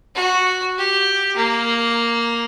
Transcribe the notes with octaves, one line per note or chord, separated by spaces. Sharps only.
F#4
G4
A#3